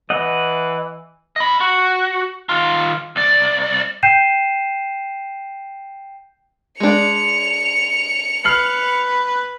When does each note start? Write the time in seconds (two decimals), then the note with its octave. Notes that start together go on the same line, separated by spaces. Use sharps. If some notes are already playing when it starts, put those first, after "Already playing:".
0.10 E3 D#5 F#5
1.36 D#5 B5
1.61 F#4
2.49 D#3 F4
3.16 C2 D5
4.03 G5 G6 C7 D#7 E7
6.80 G#3 D4 C#7 F7
8.45 B4 F6 C7 F#7